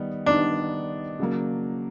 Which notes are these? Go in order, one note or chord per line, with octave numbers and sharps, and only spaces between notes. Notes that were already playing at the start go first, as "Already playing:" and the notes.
Already playing: D#3 G3 B3 D#4
D#3 G3 B3 D4 D#4
C#3 F#3 A#3